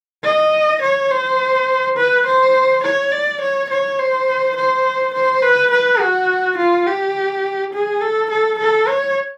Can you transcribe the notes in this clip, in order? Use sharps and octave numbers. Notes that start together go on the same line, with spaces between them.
D#5
C#5
C5
B4
C5
C#5
D5
C#5
C#5
C5
C5
C5
B4
B4
F#4
F4
G4
G#4
A4
A4
A4
C#5